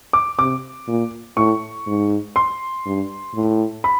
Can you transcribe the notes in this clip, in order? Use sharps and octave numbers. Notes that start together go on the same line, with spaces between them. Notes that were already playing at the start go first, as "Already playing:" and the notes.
D6
C3 D6
A#2
A2 C#6
G#2
C6
G2
A2
B5